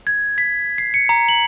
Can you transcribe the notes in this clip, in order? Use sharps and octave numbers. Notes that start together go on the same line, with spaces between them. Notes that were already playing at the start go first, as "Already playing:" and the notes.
G#6
B6
C7
C#7
A#5
F#7